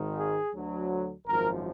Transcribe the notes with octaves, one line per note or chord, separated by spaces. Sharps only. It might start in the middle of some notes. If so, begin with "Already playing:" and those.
Already playing: G#1 G#2 D#3
G#4
D2 D3 F#3
G#1 F#2 F3 A#4